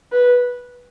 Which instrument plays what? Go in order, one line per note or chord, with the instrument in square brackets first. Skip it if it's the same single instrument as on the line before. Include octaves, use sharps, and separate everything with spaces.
[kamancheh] B4